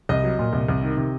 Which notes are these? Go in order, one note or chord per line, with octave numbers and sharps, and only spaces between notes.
C2 D#5
F#3
A#2
C2
C2
D#3
C3